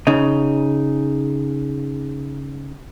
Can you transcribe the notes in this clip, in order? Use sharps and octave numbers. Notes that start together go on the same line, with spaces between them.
C#3 D#4